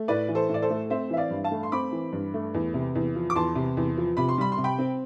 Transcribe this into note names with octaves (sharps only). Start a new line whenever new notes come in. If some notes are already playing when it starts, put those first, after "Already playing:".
Already playing: A3
A2 B4 D5
E3
A4 C5
A2
D5
A4 C5
A3
C4 C5 E5
E3 E5
D5 F5
G2
F5 A5
A3
C6
C4 B5 D6
E3
G2
A3
E2
C3
E2
F3
D6
E2 A5 C6
C3
E2
F3
C3 B5
C6
G3 B5
C6
C3
G5 B5
C4